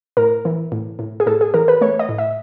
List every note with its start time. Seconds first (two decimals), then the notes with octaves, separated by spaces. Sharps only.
0.17 A2 A#4
0.45 E3
0.72 A2
0.99 A2
1.20 G#4
1.26 A2 A4
1.41 G#4
1.54 E3 A#4
1.68 B4
1.81 A3 C#5
1.99 D#5
2.09 A2
2.18 E5